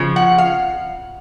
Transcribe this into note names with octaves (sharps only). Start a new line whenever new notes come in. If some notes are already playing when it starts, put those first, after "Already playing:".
Already playing: C#3 F3
F#5
F5